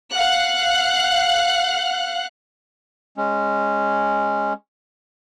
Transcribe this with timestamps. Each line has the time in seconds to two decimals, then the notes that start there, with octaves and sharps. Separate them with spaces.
0.14 F5 F#5 F#6
3.17 G#3 C#4